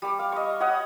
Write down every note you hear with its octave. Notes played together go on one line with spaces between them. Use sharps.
G3 D6
F5
D#5 C#6
C#5 D#5 F#5 D#6